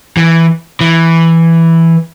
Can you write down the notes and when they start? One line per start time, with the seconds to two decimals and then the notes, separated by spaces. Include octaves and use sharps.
0.17 E3
0.81 E3